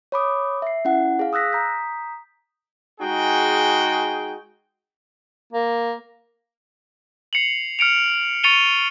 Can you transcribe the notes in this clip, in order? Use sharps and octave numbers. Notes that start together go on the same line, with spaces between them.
C#5 B5 D6 D#6
E5 C7
C#4 E4 F#5
G#4 F5
D#6 E6 F#6 A#6 B6
A#5 D#6 G6 B6
G#3 D#4 F#4 G#4 G5
A#3
C7 C#7 F7 F#7
F6 C#7 D7 F7
C#6 A6 C#7 D#7 F7 G7